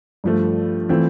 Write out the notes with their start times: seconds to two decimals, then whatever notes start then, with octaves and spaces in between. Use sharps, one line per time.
0.24 G2 F3 A3
0.89 E3 A3 C4 F4